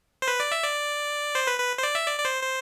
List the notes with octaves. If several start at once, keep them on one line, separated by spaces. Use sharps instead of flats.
C5
B4
D5
E5
D5
C5
B4
B4
C5
D5
E5
D5
D5
C5
C5